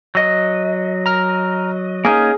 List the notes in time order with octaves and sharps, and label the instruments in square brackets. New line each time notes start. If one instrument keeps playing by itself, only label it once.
[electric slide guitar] F#3 D#5
[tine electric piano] A#5 F6
[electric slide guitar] A#3 C#4 D#4 [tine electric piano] G#4